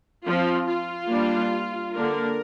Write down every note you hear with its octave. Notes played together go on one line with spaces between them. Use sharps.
F3 C4 F4
F4
G3 A#3 D4
D3 A#3 D4 A#4